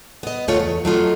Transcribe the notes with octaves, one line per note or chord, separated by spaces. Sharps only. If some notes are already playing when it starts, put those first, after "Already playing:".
B3 D#5
D2 G2 A3 F4 C#5
E2
F#3 A3 F4 D#5